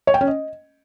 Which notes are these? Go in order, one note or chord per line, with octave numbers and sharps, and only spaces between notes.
C#5
G5
C#4
D#5